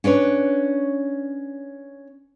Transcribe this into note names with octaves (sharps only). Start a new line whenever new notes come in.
C#4 D4 B4 C#5